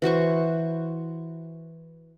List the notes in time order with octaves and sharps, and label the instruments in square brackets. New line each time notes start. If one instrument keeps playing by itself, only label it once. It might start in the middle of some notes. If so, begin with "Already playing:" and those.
[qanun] E3 F#4 C5 C#6